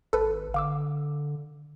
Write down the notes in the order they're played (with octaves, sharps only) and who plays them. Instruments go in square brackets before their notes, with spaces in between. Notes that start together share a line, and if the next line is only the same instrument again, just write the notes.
[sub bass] G#1 [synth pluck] A4 B4
[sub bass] D3 [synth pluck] F5 D6 E6